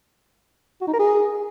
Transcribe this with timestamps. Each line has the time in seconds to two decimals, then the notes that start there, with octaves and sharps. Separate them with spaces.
0.81 F#4
0.87 D#4
0.93 A#4
0.99 G#4